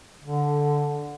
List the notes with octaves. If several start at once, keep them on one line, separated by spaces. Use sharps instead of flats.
D3